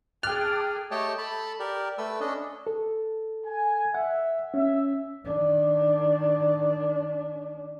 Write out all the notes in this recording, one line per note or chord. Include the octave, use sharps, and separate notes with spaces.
G#4 G5 A5 D6 F6 F#6
A3 G4 C#5 D#5 G5 A5
A4 A5 B5
G4 A#4 D5
A3 A4 B4 E6
C#4 D4 A4 D#5
A4
G#5
E5 F#5
C#4 E5
D#3 D4